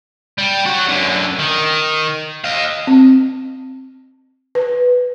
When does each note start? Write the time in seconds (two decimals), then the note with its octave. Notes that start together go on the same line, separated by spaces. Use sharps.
0.38 G3
0.66 F#3 F#4
0.89 F#2 D3
1.39 D#3
2.44 D#5 F5
2.87 C4
4.55 B4